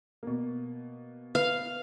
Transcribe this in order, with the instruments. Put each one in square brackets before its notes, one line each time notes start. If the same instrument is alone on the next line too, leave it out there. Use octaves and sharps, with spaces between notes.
[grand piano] B2 A#3
[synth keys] B4 [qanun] F5